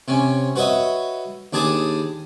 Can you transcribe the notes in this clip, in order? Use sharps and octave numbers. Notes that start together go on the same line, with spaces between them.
C3 C#4
F#4 B4 C#5 D#5 E5
D#2 D4 G#4 A5 B5 D#6